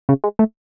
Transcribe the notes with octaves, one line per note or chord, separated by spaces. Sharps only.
C#3
G#3
A3